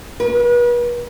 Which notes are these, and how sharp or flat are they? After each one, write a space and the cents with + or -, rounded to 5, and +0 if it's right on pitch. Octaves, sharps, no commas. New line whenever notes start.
B4 -40